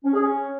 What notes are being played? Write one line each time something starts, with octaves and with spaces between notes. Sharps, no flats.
C#4
G#4
C#4